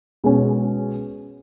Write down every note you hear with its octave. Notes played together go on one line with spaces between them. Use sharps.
B2 G#3 C#4